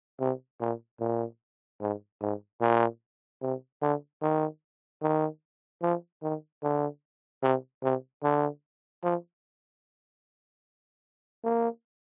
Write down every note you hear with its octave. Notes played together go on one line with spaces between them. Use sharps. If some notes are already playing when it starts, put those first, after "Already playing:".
C3
A#2
A#2
G#2
G#2
A#2
C3
D3
D#3
D#3
F3
D#3
D3
C3
C3
D3
F3
A#3